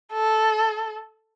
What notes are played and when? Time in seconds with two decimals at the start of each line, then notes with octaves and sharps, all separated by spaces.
0.13 A4